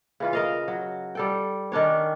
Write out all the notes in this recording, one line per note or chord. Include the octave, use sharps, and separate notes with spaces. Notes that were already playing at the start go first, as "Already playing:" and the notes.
C#3 E3 F4
A#4 D#5 F5
F#3
G3 A4 G5
D#3 C#4 D4 C#5